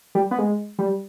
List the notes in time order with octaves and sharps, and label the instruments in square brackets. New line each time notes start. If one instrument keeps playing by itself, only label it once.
[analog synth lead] G3
B3
G#3
G3